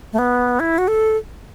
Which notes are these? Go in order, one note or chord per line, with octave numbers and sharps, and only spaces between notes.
A3
B3
E4
F#4
A4